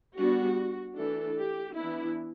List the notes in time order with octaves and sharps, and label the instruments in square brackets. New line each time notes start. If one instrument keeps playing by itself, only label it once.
[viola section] G3 B3 D4 F#4
E3 A3 D4 A4
G4
E3 B3 D4 E4